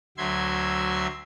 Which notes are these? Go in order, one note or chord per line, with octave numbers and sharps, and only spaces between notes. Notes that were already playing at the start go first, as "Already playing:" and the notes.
D2 F#3 E5 C6 G#6